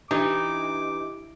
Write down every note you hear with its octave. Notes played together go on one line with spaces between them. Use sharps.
E3 D4 D#4 G4 D6